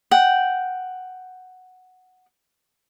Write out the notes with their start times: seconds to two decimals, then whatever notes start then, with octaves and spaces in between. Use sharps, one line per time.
0.11 F#5 G5